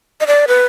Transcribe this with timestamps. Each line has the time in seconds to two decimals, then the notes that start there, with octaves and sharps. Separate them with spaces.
0.21 D#5
0.27 D5
0.48 B4